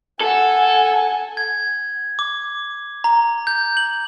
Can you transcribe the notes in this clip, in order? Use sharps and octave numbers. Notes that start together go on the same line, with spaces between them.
A4 F#5 G#5
G#6
D6
A#5
G6
F#7